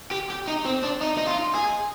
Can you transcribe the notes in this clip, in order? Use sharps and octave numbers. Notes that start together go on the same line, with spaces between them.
G4
G4
D#4
C4
D4
D#4
D#4
F4
G#4